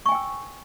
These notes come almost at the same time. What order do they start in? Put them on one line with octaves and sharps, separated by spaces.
C#6 G#5 G5 E6